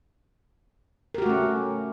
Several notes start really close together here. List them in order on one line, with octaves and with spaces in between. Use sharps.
A#4 G4 F#4 A3 C#4